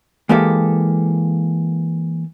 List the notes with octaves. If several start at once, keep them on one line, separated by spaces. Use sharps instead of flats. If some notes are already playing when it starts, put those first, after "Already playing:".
E3 G#3 A#3 G4 A4